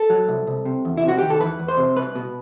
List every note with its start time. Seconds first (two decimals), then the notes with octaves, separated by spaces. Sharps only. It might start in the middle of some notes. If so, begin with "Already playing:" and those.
Already playing: A4
0.10 F#3
0.28 C2
0.47 C2
0.65 C3
0.85 E2
0.97 E4
1.04 C3 F#4
1.18 D#3 G4
1.30 A4
1.41 E2 B4
1.59 E2
1.68 C5
1.77 C3
1.96 C2 B4
2.15 B2